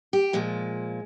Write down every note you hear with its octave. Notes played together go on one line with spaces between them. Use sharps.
G4
A#2 F3 G#3